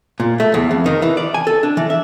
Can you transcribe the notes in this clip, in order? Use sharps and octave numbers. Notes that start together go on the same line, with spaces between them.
A#2
A3
E2
F2
D#3
E3
D5
G#5
A4
D4
E3
E5